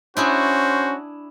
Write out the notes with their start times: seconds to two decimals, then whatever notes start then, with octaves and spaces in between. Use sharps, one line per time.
0.17 C#4 D4 E4 F#4 G#4 C5